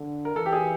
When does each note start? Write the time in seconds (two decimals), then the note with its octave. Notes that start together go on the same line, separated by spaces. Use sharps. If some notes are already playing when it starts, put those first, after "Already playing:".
Already playing: D3
0.25 A#4
0.36 E3 A4
0.46 G4
0.53 G#4